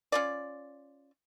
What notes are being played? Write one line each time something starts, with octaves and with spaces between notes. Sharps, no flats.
C#4 F4 D5